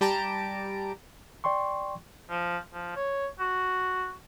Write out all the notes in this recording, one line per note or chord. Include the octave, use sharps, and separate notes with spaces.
G3 G4 A5 A#5 D7
D5 G5 C6 C#6
F3
F3
C#5
F#4